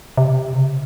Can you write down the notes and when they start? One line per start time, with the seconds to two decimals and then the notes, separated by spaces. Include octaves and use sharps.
0.18 C3
0.53 C#3